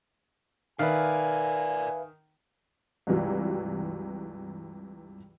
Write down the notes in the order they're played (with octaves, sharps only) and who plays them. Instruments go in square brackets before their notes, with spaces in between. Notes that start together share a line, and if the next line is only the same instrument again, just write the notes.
[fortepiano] D#3 [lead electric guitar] A#4 D5 [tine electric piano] B4 E5 F5 [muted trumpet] G#5
[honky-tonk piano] C#2 G2 C3 E3 F#3